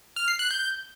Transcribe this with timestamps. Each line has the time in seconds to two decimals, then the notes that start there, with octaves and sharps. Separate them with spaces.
0.16 F6
0.28 C7
0.39 F#6
0.51 G6